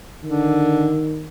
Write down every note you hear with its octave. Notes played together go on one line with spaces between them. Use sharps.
D3 D#3